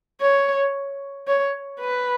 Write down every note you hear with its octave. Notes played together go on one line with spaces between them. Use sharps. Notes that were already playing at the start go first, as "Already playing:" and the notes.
C#5
C#5
B4